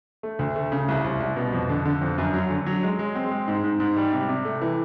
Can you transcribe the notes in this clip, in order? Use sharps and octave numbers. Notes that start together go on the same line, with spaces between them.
A3
D2
A3
C#3
C2
C2
C2
B2
F2
D3
D3
F2
F#2
F#3
D3
F#3
G#3
G#3
C4
G#3
G#2
G#2
G#2
G3
C3
C3
A3
E3